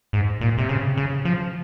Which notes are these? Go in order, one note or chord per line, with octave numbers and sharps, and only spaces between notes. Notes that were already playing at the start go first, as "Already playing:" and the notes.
G#2
A#2
C3
C#3
C#3
F3